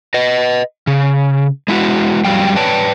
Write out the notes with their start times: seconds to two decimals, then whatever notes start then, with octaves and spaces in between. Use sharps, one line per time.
0.14 B4 D#5
0.87 C#3
1.68 G#3 E4 F#4
2.25 F2 F#3 G3 F5 G5
2.56 B4 C#5 D5 G5 A5